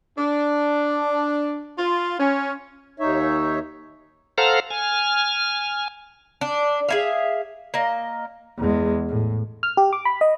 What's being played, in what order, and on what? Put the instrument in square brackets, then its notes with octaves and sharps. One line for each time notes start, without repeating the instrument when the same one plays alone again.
[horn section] D4
F4
C#4
[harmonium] D#2 D#4 C#5 E5
[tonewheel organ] A4 C5 F5 F#5 A#5 F6
G#5 F6
[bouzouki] D4
G#4 E5 F5
A#3 D#5
[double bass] E2 G#3
A2
[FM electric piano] F6
G4
D6
B5
D#5